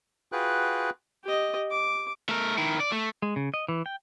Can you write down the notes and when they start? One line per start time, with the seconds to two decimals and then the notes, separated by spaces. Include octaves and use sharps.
0.32 F4 F#4 G#4 B4 G5 F#6
1.24 G4 D#5
1.70 D6
2.29 A3 A#4
2.57 D#3 E4
2.80 D5
2.92 A3
3.22 G#3
3.36 C#3
3.54 D#5
3.68 E3
3.86 G5